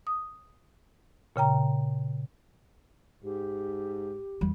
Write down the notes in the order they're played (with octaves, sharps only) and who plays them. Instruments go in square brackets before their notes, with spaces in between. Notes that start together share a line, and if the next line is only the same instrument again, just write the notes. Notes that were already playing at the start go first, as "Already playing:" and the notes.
[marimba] D#6
A#2 C#3 G5 A#5
[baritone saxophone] G#2 [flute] G4
[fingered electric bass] E2 [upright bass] G3